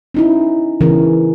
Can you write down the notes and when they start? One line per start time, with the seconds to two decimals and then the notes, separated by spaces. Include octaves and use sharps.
0.14 C#4 D#4 E4
0.81 C#3 E3 C#4 A#4